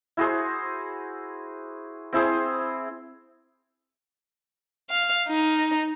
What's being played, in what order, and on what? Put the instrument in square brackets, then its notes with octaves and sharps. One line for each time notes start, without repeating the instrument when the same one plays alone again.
[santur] E4 F#4 G#4 C5
C4 E4 G#4 C5
[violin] F5
D#4